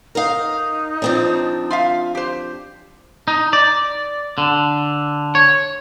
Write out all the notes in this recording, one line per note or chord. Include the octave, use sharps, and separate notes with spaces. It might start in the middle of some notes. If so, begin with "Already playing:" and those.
D#4 A#4 F5
F3 C4 D4
F4 E5 F5
G4 C5
D#4
D5
D3
C#5